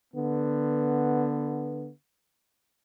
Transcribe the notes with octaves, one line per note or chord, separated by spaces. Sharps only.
D3 B3